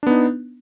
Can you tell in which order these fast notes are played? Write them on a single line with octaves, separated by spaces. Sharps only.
D4 B3 D#4